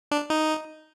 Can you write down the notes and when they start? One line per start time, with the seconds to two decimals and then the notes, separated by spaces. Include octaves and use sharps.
0.11 D4
0.30 D#4